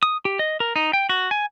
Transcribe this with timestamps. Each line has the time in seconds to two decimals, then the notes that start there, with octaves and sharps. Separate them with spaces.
0.03 D#6
0.25 G4
0.39 D#5
0.60 A#4
0.76 D#4
0.93 G5
1.09 F#4
1.31 G#5